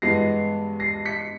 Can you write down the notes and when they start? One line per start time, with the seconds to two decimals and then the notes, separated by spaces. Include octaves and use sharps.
0.02 G2 E3 G#3 B3 A#6 C7
0.80 A#6 C7
1.06 B6 C#7